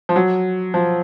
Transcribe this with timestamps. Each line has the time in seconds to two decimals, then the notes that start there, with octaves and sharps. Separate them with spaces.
0.09 F3
0.16 F#3
0.74 F3